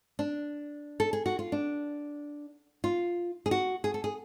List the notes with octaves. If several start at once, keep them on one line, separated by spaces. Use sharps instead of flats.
D4
A4
G#4
F#4
F4
D4
F4
G#4
F#4
G#4
A4
G#4